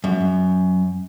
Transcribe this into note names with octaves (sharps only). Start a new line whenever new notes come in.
F#2